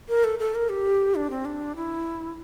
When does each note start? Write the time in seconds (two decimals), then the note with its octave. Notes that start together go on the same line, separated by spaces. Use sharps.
0.09 A#4
0.24 A4
0.39 A4
0.55 A#4
0.69 G4
1.15 D4
1.30 C4
1.45 D4
1.76 E4